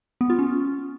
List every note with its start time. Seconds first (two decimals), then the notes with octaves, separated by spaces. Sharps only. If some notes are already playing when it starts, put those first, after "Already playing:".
0.21 B3
0.30 F4
0.39 C#4